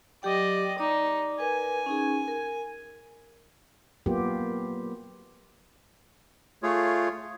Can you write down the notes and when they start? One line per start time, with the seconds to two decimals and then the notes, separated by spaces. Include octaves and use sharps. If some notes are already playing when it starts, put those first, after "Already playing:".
0.23 F#3 G4 D5 D#5 G5
0.78 D#4 D5 D6
1.40 A#4 B4 G#5
1.86 C#4 D#4 G#4
2.28 A#4
4.06 F#3 A#3 B3 F4 G4
6.63 A3 F4 G#4 C#5